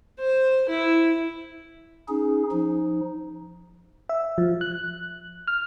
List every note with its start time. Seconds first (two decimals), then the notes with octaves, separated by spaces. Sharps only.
0.19 C5
0.69 E4
2.08 C#4 D#4 G#4
2.51 F3 D#4
4.09 E5
4.38 F3
4.61 F#6
5.47 F6